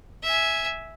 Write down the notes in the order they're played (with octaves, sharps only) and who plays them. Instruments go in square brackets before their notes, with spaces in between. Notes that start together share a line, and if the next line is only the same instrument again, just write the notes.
[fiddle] E5 G#5